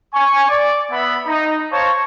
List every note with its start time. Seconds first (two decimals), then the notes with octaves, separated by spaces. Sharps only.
0.14 G#5 C#6
0.49 D5
0.91 B3 E5 B5
1.26 D#4
1.72 C5 C#5 F5 A5 A#5 C#6